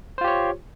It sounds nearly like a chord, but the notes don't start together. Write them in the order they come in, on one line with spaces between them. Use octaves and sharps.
C5 F4 G4 C#5